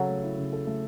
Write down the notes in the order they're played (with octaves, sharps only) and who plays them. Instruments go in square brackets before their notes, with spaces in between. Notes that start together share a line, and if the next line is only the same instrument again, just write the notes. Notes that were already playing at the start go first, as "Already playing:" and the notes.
Already playing: [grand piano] C#3 A4 [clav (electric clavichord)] F#3
[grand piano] A3
E4
C#3
A4
A3